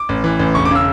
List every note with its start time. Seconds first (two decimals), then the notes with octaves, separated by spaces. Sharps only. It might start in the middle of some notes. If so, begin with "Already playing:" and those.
Already playing: D6
0.09 A1
0.24 E3
0.39 A1
0.55 E1 C#6
0.65 D6
0.71 C#3 E6